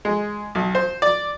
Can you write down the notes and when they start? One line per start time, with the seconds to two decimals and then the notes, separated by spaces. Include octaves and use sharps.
0.05 G#3
0.55 B1
0.75 C5
1.02 D5